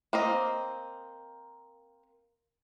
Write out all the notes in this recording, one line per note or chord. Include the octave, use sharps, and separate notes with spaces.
A#3 C4 D#5